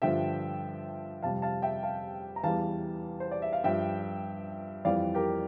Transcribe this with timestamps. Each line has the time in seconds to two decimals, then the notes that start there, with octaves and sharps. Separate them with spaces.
0.02 G2 D3 F3 E5 G5
1.23 F2 C3 G3 F5 A5
1.42 F5 A5
1.62 E5 G5
1.83 F5 A5
2.36 A#5
2.43 E2 E3 G3 F5 A5
3.20 C5
3.31 D5
3.42 E5
3.53 F5
3.64 G2 F3 E5 G5
4.85 F2 E3 G3 D5 F5
5.15 G4 A#4